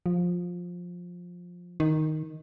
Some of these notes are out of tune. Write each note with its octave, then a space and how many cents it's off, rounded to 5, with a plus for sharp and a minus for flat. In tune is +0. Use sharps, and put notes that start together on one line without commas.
F3 +15
D#3 +0